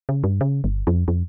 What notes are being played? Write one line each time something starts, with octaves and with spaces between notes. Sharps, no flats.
C#3
G2
C#3
G1
F2
F2